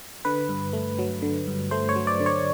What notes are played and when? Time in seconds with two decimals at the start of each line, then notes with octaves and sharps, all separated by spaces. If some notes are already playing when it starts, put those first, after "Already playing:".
0.25 D3 B4
0.49 G2
0.73 A3
0.99 F#3
1.22 D3
1.47 G2
1.71 A3 C5
1.89 C#5
1.96 F#3
2.07 D5
2.20 D3
2.26 C#5